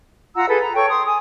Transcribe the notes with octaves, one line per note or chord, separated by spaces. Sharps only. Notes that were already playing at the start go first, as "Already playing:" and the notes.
F4 F#5 A#5 E6
G#4 A4 B4
A#5
A4 C#5 G5 C#6
C6 D#6
G#5 D#6